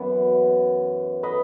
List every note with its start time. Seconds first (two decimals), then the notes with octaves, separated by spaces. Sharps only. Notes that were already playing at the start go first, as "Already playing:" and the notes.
Already playing: F#2 E3 B3
1.23 B4 D#5